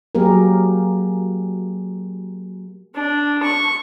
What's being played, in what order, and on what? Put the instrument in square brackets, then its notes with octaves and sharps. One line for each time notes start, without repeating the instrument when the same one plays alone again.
[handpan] F#3 A#3 G4 G#4 A#4
[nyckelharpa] D4
C#6